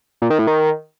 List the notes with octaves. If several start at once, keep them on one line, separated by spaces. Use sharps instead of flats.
A#2
D#3
A2
D#3